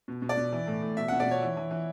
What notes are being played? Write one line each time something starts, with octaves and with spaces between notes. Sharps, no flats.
B2
B2
D5
B2
E3
A2
A2
B2 E5
B2 F#5
D5
B2 C#5
E3
E3
E3